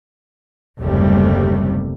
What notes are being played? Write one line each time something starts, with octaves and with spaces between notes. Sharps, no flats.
F#1 D#2 C3 G3 A3